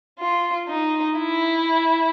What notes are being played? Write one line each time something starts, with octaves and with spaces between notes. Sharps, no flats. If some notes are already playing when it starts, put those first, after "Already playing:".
F4
D#4
E4